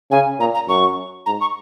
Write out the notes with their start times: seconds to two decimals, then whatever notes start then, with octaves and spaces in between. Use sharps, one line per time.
0.11 C#3 G#5
0.40 A#2 A#5
0.54 A#5
0.68 F#2 C#6
1.26 G#2 A#5
1.40 C#6